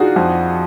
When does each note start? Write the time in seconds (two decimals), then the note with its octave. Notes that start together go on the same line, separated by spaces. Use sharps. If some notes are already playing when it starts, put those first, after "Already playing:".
Already playing: D4 D#4 F4 F#4 G#4
0.16 F2